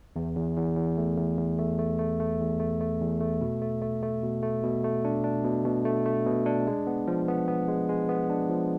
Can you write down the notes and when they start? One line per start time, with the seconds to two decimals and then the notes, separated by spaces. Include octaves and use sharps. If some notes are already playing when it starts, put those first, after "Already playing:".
0.16 E2
0.37 E2
0.57 E2
0.77 E2
0.98 A3
1.18 E2
1.39 E2
1.58 A3
1.79 A3
1.99 A3
2.20 A3
2.40 E2
2.60 A3
2.81 A3
3.01 E2
3.21 A3
3.41 B2
3.62 A3
3.82 A3
4.03 A3
4.23 B2
4.43 A3
4.63 B2
4.84 A3
5.05 D4
5.24 D4
5.45 B2
5.65 B2
5.85 A3
6.05 A3
6.26 B2
6.46 D4
6.67 G#3
6.87 B3
7.07 F3
7.28 B3
7.48 B3
7.68 G#3
7.89 G#3
8.09 B3
8.30 D4
8.49 F3